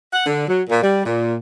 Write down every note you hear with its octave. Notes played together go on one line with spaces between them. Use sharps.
F#5
D3
F#3
A#2
G3
A#2